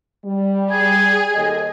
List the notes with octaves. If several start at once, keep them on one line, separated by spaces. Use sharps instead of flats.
G3
G#4 G#6
D#2 A4 D#5